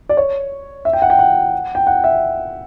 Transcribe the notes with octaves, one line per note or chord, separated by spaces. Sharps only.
D5
C#5
E5
G5
F#5
G5
F#5
G5
F#5
E5